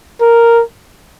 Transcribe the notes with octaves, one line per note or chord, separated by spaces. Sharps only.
A#4